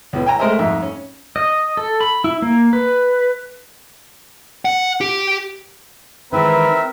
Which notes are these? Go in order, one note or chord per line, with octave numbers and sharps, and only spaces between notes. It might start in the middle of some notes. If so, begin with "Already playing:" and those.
C#2 B2 E3 B3
G5 G#5 A#5
G#3 A3 A#4 C5 D#5 E5
F2 G#2 D#4 E5
C#4
D#5
A4
B5
E4
A#3
B4
F#5
G4
D#3 E3 G#3 C4 A#4 B4 E5